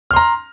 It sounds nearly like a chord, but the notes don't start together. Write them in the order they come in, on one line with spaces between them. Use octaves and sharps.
F6 C6 A#5